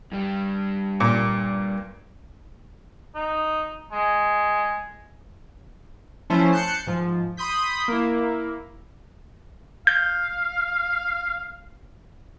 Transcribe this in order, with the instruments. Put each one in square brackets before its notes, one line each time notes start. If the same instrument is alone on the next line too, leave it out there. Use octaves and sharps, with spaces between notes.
[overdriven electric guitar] G2 G3
[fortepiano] A#2
[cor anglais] D#4
G#3
[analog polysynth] F3 A3 C#4 E4 C5
A5 F#6 G6 C7 C#7
G#2 F3
B5 C6 D#6 G6 B6
A#3 E4
[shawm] F5 [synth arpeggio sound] G6